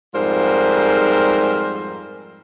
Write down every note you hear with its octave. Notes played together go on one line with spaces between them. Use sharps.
F2 G#2 G3 F4 A#4 C5